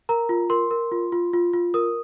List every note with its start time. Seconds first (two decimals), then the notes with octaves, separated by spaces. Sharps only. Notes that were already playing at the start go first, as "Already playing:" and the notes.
0.09 A#4 A#5
0.29 F4
0.50 A#4 C6
0.71 A#4
0.92 F4
1.12 F4
1.33 F4
1.53 F4
1.74 A#4 D#6